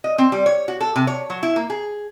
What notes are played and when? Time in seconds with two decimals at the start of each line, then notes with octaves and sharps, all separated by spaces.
0.04 D#5
0.18 C4
0.32 G3
0.46 C#5
0.68 F#4
0.81 A4
0.96 C3
1.07 C#5
1.30 F#3
1.43 E4
1.56 A#3
1.70 G#4